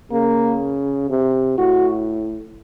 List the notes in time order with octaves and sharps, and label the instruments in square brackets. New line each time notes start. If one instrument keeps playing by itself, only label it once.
[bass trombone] C#3 [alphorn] A#3
[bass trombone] C3
[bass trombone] A2 [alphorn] F#4